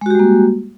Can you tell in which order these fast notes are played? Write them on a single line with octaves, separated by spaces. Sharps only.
G#3 F#4 G4 G3 A#3